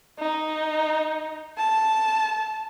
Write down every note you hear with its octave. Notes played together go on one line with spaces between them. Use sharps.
D#4
A5